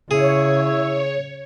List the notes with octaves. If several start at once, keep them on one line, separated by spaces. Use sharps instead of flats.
C#3 E4 G#4 C#5